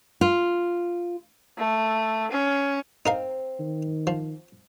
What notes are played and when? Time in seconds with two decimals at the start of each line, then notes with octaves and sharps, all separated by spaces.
0.21 F4
1.58 A3
2.31 C#4
3.06 C4 D#4 A#4 F5
3.60 D#3
4.07 F3